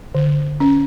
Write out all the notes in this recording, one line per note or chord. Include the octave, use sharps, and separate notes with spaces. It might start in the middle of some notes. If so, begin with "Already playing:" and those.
D3
C#4